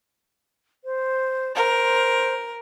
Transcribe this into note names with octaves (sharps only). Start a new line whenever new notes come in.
C5
A#4 C5